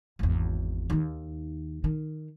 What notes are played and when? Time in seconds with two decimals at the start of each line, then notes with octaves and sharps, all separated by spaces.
0.19 G#1 E2
0.90 D#2 D#3
1.84 D#3